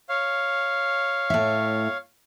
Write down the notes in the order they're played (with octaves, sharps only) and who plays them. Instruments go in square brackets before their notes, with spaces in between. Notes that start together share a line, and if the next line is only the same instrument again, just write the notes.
[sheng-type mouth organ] C#5 F5
[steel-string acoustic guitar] A2 E5